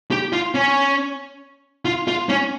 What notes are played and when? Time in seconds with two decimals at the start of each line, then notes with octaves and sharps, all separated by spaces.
0.11 G4
0.33 F4
0.55 C#4
1.85 F4
2.08 F4
2.29 C#4